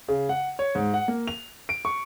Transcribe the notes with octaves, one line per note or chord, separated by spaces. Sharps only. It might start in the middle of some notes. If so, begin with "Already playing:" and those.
C#3
F#5
C#5
G#2
F#5
A#3
F7
D7
C#6